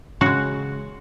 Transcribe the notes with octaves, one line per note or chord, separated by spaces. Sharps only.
C#3 G#3 F#4